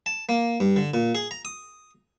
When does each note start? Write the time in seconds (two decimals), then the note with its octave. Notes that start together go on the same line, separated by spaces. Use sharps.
0.06 A5
0.29 A#3
0.60 G2
0.76 D3
0.94 A#2
1.15 G#4
1.31 A#5
1.45 D#6